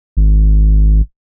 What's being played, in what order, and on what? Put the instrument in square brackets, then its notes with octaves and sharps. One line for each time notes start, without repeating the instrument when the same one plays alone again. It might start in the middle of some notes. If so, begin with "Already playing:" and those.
[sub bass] G#1